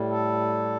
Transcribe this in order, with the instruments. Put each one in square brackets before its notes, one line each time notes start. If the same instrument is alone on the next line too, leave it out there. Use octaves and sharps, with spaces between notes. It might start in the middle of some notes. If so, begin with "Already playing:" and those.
Already playing: [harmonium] A2 G3
A4